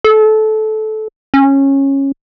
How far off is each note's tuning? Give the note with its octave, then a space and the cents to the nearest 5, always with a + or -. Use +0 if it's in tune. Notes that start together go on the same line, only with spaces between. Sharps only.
A4 -20
C#4 -15